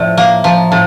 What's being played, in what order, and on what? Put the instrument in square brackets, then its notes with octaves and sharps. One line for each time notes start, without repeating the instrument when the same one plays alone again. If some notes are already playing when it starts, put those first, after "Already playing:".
Already playing: [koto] A2 F3 [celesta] D5 E5
[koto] A#3 [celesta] F5
[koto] F3 [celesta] A#5
[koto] A2 [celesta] A5